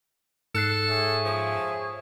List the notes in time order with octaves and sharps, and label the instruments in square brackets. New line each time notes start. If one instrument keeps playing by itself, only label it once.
[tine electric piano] G#2 F#6 C7 [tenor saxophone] A4
[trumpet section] G#4 C#5 E5
[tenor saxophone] F3